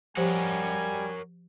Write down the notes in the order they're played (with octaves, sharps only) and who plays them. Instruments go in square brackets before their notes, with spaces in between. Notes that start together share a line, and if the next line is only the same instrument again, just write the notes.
[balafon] F3 G4 C5 [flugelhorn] G3 [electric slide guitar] A#4 C#5 F#5 [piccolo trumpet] G#5